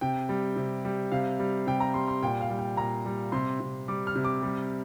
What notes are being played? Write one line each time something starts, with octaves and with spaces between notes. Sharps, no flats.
C3 G5
G3
C3
G3
C3 F5
G3
C3 G5
A#5
G3 C6
C6
A#2 G5
F5
G3
G5
A#2 A#5
G3
C3 C6
C3
G3 D6
F6
C3
D6
G3